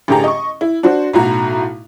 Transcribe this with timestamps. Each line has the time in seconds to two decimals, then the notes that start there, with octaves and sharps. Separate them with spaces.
0.08 A1 D3 G4 G#4 A#5
0.24 D#5 C#6
0.61 E4
0.83 D4 F#4 C5
1.13 B1 A2 E4 F#4 A#5